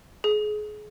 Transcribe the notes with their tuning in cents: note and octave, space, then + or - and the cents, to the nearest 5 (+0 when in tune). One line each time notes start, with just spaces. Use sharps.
G#4 +30